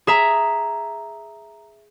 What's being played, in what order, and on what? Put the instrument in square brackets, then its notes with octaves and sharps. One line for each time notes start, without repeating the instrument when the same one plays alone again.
[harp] G#4 E5 A#5